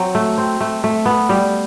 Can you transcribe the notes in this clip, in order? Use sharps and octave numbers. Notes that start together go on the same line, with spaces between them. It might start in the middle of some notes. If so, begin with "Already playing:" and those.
Already playing: F#3 C4
A3
C4
A3
A3
B3
G3